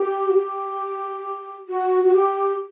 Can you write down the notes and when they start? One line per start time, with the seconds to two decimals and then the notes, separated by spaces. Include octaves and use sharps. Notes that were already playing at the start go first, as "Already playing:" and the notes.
Already playing: G4
0.29 F#4
0.34 G4
1.68 F#4
2.04 F#4
2.12 G4